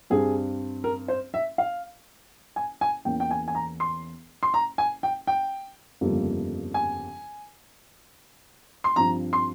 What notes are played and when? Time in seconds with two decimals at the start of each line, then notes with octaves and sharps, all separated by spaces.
0.10 G2 G3 C4 G#4
0.84 A#4
1.08 C5
1.34 E5
1.58 F5
2.56 G#5
2.81 G#5
3.05 E2 E3 A#3 C#4 G5
3.20 G5
3.31 G#5
3.48 G#5
3.55 A#5
3.80 C6
4.43 C6
4.54 A#5
4.78 G#5
5.03 G5
5.27 G5
6.01 G1 F2 C#3 G3 A#3
6.74 G#5
8.84 C6
8.96 G2 F3 C4 A#5
9.33 C6